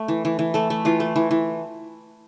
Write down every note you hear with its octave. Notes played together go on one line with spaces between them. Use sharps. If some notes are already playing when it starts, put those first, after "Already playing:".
Already playing: A3
E3
E3
E3
A3 A4
A3
E3 F4
A3
E3
E3